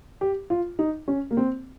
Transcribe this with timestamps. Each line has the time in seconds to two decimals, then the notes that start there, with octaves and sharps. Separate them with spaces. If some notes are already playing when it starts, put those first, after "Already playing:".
0.21 G4
0.50 F4
0.79 D#4
1.08 C#4
1.31 A#3
1.37 C4